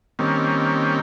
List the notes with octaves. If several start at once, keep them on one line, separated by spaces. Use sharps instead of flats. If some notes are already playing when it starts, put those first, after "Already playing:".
D#3 G3 A#3 C4 C#4